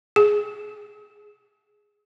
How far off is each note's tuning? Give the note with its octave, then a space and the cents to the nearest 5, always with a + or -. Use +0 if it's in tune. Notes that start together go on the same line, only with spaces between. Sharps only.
G#4 +5